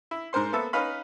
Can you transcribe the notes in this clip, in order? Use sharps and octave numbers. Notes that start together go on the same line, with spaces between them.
E4
G#2 A#4 C5 C6
A#3 B3 A4 E5
C#4 D#4 B4 F5 B5